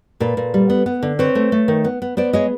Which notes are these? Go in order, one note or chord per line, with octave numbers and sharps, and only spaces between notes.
A#2 A4 B4
A#2
G3
B3
B3
D3
C4 B4 C#5
A3
A3
D#3
B3
B3
B3 C5 D5
G#3 C#5 D#5